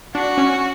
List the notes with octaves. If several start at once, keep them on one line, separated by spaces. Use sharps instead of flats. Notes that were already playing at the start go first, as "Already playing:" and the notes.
D4 F#4
C#4